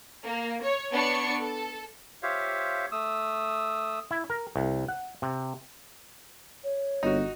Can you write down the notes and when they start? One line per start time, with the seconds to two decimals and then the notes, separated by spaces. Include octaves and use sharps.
0.24 A#3
0.62 C#5
0.91 B3 D4 C#5 C#6 C#7
1.38 A4
2.23 F4 G4 C5 C#5 E5 F5
2.92 A3 D#6 E6
4.11 E4
4.30 A#4
4.56 C2
4.89 F#5
5.22 C3
6.64 C#5
7.03 G1 D#4 F#4